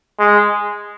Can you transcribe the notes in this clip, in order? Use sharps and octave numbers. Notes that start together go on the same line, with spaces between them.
G#3